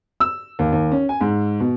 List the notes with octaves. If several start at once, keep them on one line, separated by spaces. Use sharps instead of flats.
E6
D#2
D#2
C#4
G#5
G#2
B2